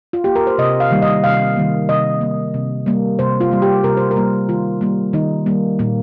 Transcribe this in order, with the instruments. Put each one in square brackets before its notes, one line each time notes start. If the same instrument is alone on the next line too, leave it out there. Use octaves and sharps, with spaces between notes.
[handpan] F4
A#3 G4
A#4
C5
C3 D#5
F5
D#3 G3 A#3
D#5
C3 F5
D#3 G3 A#3
C3 D#5
G3 A#3
C3
G3 A#3
C3 C5
F4
G3 A#3
G4
C3 A#4
C5
A#4
G3 A#3
D#3 F4
G3 A#3
D#3 D#4
G3 A#3
A#2 A#3